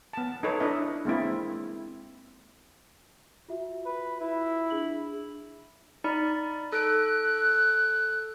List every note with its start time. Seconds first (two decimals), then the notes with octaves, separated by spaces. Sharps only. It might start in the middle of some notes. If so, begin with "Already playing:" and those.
0.13 B3 A5
0.43 D#4 A4 B4 C#5
0.60 D4 E4 B4 D#5 E5
1.05 G#3 A#3 C4 E4
3.48 F4 F#4 E5
3.85 B4
4.21 E4
4.70 D4 G#4 F#7
6.04 D#4 D5 B5
6.72 A4 F#6 D7